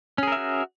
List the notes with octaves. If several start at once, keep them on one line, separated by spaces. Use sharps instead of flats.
C#4 F#4 G#4 A#4 E5